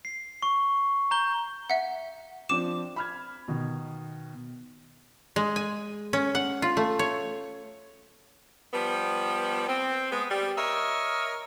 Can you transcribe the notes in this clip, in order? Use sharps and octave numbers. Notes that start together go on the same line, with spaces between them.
C7
C#6
A#5 G6 G7
E5 F#5
F3 C4 D4 D6 E7
B5 F6 G#6
B2 D#3
G#3
G#5
C#4
F#5
F4
A3
C#5
F3 G3 B3
C4
G#3 B3
G3
A#4 C#5 D#5 E5